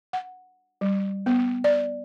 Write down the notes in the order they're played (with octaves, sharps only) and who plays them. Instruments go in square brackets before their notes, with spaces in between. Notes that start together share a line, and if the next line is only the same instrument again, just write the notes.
[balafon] F#5
G3
B3
D5